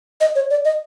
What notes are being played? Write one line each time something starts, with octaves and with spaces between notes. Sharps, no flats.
D#5
C#5
D5
D#5